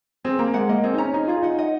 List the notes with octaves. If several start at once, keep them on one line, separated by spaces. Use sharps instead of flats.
C4 G#4
A#3 A#5
G#3 F#5
A#3 D#5
C4 G#4
D#4
C#4 A#5
D#4 G#4
F4 G#4
F4
D#4 F#5
D#5